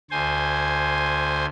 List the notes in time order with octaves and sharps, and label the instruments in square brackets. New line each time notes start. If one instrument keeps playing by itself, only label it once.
[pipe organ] D2 C5 G#5